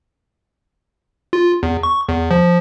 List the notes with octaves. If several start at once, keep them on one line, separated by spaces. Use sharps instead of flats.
F4
E2
C#6
E2
F3